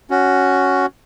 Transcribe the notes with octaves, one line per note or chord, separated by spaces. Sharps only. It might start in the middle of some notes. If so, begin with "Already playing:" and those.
C#4 F#4